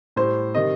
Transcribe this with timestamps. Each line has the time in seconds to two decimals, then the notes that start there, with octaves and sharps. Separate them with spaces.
0.16 A2 G3 C5
0.55 C3 D#3 G3 D#5